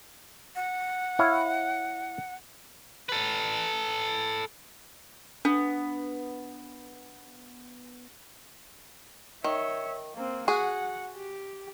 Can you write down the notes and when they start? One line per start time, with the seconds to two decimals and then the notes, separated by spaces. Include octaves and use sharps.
0.56 F#5
1.19 E4 C#5 F5
3.09 A4 B4
5.45 B3 D4
9.44 D#3 C#5 E5
10.14 A#3 C4
10.48 F#4 G#4 F#5
11.15 G4